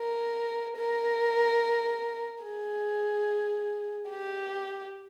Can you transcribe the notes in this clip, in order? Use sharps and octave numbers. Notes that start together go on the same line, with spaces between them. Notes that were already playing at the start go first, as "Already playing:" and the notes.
Already playing: A#4
A#4
G#4
G4